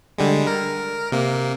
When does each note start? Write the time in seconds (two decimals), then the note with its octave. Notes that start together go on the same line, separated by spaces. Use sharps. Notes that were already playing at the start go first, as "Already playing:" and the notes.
0.18 D3 G3 G#3
0.47 A#4
1.12 C3 A#3